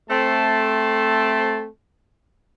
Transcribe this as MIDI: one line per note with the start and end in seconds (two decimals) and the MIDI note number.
0.10 1.66 57
0.10 1.66 60
0.10 1.66 81